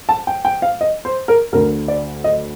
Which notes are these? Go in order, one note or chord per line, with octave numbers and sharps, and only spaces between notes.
A5
G5
G5
F5
D#5
C5
A#4
D2 D3 A#4
D5
D#5